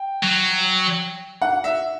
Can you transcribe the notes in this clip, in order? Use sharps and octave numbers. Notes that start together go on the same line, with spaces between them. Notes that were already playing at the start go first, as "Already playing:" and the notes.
Already playing: G5
F#3
F#5
E5